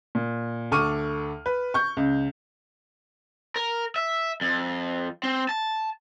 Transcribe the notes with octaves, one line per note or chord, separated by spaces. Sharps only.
A#2
D2 A4 C#6 D6 F6 D#7
B4
C#6 G6
C#2
A#4
E5
F2
C4
A5